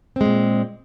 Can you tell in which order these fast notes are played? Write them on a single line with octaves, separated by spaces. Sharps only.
C4 G#3 A#2